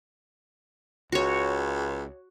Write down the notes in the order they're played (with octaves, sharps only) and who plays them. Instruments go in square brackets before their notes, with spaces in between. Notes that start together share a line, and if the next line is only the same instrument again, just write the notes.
[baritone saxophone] C#2 [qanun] F#4 C#5